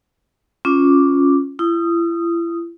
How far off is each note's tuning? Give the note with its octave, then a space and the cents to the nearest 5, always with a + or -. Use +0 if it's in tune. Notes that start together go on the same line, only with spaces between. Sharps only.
C#4 +0 F4 +5 D6 +0
E4 +40 D#6 +0